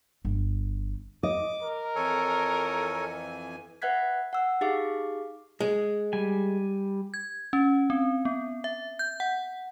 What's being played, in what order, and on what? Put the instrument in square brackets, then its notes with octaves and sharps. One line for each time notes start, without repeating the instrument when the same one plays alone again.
[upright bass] G1
[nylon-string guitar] D#5 [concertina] D6
[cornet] A#4
[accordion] F2 E3 G#5 [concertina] A4 C#5
[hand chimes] B4 E5 F#5 F#6 G#6 B6
F#5 E6
D#4 G4 G#4 F5 D6
[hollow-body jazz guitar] G#3
[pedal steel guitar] G3 G#5
[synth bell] G#6
C#4
C4
B3
E5
G6
F#5